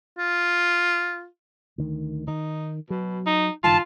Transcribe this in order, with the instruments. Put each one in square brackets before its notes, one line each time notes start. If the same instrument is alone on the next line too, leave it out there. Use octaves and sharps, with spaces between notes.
[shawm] F4
[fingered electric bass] D2 D#3
[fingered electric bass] D#3 [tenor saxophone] D#4
[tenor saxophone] B2 [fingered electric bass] F#3
[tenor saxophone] D#4
[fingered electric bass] F#1 G2 D#3 [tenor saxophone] F4 [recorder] A5